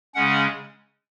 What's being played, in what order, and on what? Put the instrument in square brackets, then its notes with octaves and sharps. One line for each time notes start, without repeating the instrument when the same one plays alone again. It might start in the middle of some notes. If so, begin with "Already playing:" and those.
[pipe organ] C#3 G#3 C#4 F#5